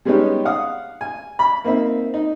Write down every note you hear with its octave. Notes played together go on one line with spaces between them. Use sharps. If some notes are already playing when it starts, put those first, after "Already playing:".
G3 G#3 B3 C#4 D#4 G4
F5 F#5 D#6
G#5
B5
A#3 C4 D#4 E5
D#4